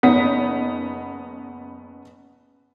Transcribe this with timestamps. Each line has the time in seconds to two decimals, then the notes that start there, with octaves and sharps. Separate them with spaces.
0.03 F#1 B3 D#4 B6